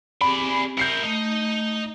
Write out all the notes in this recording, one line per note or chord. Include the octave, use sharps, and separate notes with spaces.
C4 G4 G#4 D5 B5
E4 A#4 G6 C7 C#7
A3 D#4